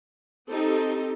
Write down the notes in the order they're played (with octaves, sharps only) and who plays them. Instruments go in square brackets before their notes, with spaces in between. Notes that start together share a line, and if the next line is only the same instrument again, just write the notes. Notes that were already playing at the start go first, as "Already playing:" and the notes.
[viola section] C4 D#4 G4 A4